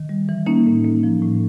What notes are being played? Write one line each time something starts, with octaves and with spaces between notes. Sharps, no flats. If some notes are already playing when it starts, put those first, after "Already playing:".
Already playing: D#3
G3
E3
A#3 C#4 D#4
A2
A#3
F3
A2